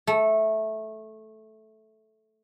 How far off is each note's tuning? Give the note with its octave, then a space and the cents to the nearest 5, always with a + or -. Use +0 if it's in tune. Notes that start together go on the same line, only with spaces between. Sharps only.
A3 -10